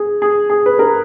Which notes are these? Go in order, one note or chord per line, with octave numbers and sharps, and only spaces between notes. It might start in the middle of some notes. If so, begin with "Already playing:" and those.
Already playing: G#4
G#4
G#4
B4
A#4